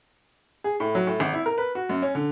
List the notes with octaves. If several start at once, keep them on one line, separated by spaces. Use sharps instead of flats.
G#4
A2
F#3
A2
G#1
E4
A#4
B4
F#4
F#2
C#4
D3